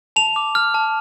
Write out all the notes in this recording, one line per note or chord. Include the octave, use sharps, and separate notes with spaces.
A5 F7
D6
F6
A5